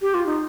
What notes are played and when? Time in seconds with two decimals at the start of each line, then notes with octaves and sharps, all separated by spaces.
0.02 G4
0.14 F4
0.26 D#4